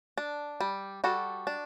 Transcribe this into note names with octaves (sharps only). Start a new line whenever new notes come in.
D4
G3
G3 F#4 A4
D4